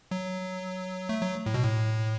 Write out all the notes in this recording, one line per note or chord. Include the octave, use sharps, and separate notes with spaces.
F#3
A3
F#3
A2
B2
A2